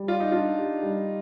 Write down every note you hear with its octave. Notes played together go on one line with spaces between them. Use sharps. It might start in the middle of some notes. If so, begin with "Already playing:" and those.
Already playing: G3
F4 D5
D#4
D4 F4
G4
G3